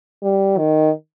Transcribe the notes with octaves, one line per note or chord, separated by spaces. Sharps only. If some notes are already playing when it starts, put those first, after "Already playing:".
G3
D#3